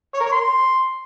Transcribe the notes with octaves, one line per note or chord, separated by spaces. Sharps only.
C#5
A#4
C#5
C6